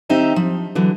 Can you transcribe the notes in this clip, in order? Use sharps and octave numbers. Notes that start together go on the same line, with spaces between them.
D#3 C4 D#4 G4 E5 A#5
F3
D3 E3 F#3